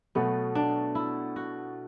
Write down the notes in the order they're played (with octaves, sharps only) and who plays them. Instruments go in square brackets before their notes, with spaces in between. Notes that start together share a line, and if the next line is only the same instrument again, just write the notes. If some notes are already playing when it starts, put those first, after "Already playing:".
[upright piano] B2 F#3 A3 [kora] B3
[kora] D4
E4
F#4